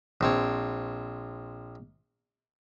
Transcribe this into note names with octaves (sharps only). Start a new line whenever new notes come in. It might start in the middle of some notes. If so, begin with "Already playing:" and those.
A#1 C4 C#5